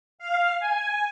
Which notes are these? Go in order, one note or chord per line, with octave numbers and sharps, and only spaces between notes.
F5
G#5